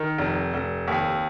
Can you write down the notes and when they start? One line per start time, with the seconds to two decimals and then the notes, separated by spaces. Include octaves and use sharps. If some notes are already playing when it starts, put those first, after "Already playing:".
Already playing: D#3
0.18 F1
0.54 F1
0.88 D#2